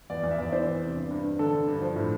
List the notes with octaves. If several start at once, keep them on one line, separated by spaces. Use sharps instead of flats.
E2 D5
E2
E5
E2 D5
E3 C5
E2
C3
G2
G2
G2
D3 A4
D3
G2
F3
A2